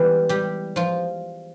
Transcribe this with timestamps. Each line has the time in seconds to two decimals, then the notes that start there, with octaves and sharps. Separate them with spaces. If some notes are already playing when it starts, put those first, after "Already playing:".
Already playing: E3 G3 G#3 B3 G4
0.29 G3 G4
0.76 F3 F4